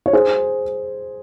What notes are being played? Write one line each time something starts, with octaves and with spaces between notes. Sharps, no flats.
C#5
G#4 C5